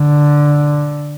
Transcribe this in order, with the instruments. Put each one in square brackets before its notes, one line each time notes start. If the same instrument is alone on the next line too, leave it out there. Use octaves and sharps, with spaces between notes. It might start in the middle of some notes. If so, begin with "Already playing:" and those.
Already playing: [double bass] D3